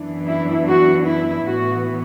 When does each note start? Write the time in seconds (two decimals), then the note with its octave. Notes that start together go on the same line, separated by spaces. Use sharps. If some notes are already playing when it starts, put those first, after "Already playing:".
Already playing: F#2 E3 B3 D4
0.26 E4
0.67 F#4
1.07 E4
1.47 A2 E3 B3 F#4